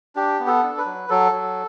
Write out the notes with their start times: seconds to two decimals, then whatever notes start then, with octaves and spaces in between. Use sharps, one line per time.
0.15 D4 G4
0.40 B3
0.47 A4
0.63 D4
0.78 B4
0.85 F#3
1.10 F#3 A4
1.32 F#3